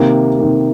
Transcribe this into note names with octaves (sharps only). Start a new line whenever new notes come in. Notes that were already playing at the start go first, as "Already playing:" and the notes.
Already playing: C3 D#3 A#3
C3 D#3 A#3